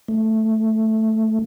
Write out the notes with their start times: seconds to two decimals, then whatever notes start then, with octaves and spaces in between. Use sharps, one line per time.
0.08 A3